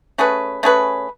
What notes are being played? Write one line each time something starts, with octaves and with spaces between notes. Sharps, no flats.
A3 C#4 G#4 B4
A3 C#4 G#4 B4